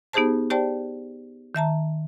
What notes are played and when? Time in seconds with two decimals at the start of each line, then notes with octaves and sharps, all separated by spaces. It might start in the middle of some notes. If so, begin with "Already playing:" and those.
0.13 B3 D#4 G4 G#4 C5 A5
0.50 G4 C5 D5 G5 A5
1.55 D#3 E5 A5 A#5